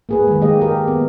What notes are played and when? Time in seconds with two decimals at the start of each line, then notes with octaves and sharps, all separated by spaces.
0.09 A#3 G#4 B4
0.27 D#3 G#3
0.41 A#3 G4 D#5
0.61 G4 A#4
0.88 B3